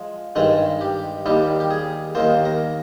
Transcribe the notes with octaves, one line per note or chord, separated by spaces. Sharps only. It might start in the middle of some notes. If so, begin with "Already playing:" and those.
Already playing: F3 G#3
G2 D#3 G#3 D#4
G4
D#2 D#3 G3 G4
G4
G#4
D#2 D#3 A#3 C5
A#4